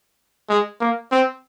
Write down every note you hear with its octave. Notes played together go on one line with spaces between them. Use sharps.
G#3
A#3
C4